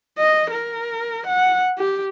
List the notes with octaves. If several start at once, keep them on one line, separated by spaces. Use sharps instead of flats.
D#5
A#4
F#5
G4